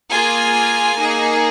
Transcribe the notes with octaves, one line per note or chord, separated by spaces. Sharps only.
A#3 F4 G#4 G#5
A#3 D#4 G#4